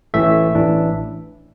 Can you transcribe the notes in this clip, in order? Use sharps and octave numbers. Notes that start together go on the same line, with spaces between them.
A1 A2 E3 A3 E5
A1 A2 E3 D4